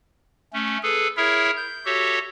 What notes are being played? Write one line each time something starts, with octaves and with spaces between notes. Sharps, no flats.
A3 C#4
G#4 A4 B4
E4 G#4 A#4 C#5 E5
G6
F#4 G4 A4 C#5 E5